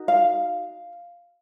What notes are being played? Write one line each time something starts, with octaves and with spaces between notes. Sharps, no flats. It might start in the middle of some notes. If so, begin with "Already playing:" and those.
Already playing: D#4 F#4 A#4
F5